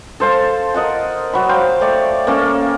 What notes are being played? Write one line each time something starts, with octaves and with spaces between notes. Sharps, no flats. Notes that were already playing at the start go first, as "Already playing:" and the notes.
A4 C5 F5 A5
A#4 D#5 F#5 A5
F#3 B5
C5 F5 G5
A3 C#5 D5
A#3 C#4 A4